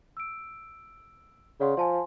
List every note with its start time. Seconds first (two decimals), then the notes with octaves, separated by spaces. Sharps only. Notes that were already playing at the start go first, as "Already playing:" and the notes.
0.17 E6 D7
1.60 C#3 D5 F#5 C6
1.77 F3 G#5 A5 C6